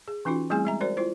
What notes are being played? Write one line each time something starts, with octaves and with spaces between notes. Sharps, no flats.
G#4
E3 C#4 D#4 F4 F#4
G3 A3 C4 E4 G#4 G#5
G#3 E5 A#5
F#4 A#4 C5 D5
E4 F4 C5